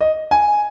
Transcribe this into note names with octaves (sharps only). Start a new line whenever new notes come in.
D#5
G#5